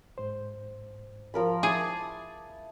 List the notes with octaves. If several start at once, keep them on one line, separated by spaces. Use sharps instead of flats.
G#2 C5
F3 A#4 B5
E4 G#4 A5 D6 D#6